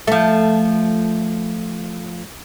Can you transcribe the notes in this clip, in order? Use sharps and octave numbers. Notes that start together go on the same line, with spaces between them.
F3 A3